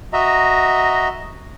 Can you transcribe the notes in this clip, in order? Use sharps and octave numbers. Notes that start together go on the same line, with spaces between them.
F#4 D#5 E5 A#5